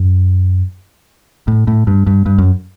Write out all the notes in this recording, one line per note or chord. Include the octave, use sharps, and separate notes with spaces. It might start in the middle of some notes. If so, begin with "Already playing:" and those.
Already playing: F#2
A2
A2
G2
G2
G2
F#2